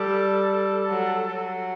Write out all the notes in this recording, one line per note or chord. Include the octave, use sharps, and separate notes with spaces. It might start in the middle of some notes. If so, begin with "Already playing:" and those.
Already playing: G3 A4
F#3
F#3